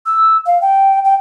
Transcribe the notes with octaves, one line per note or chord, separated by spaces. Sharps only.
E6
F5
G5
G5